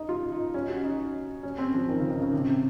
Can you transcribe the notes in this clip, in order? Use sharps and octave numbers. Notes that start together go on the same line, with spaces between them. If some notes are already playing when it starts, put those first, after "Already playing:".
Already playing: D#4
F4
D#4
C#4
F#4
D#4
C#4
C4
F3
D#3
C#3
D#3
C#3
C3
C3